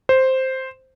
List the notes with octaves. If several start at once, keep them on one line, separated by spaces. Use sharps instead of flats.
C5